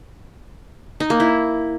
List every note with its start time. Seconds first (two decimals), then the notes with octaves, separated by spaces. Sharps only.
1.00 D#4
1.10 A#3
1.20 E4